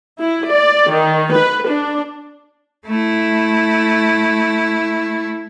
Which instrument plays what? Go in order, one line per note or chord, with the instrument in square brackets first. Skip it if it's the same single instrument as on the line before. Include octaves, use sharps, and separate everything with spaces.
[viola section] E4
D5
D#3
B4
D4
[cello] A3 E4